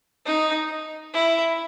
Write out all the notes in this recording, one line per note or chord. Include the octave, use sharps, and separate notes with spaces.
D#4
E4